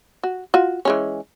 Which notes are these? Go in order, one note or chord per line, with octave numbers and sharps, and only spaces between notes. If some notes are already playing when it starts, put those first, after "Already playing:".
F#4
F4 F#4
E3 G#3 C#4